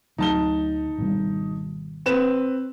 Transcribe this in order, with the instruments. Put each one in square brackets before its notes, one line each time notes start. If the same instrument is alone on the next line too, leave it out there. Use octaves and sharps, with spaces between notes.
[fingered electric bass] D2 F#3 [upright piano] D#4 A5 G7
[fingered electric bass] G#1 B2 G3
[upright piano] C4 B4 E7